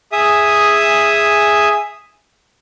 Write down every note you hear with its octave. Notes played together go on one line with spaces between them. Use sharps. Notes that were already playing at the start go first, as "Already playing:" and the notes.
G#4 E5 D#6